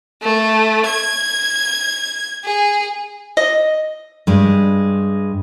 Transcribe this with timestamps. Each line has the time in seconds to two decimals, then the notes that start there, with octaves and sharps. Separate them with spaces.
0.22 A3
0.86 G#6
2.44 G#4
3.37 D#5
4.27 G2 G#3